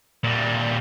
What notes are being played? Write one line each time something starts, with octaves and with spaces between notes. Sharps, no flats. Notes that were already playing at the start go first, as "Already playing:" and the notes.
A#2 G3